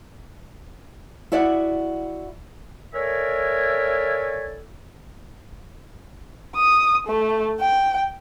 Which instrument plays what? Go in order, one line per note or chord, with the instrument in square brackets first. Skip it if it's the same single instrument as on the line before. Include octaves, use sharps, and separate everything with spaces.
[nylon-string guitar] E4 F#4 D5 E5 F#5
[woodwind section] A4 A#4 C#5 D5 E5 G#5
[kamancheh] D#6
A3
G5